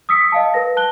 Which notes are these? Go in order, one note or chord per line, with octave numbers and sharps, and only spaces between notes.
D#6 E6 B6 C#7
D#5 F5 A5
A#4 B4 A#6
A5 F#6 G7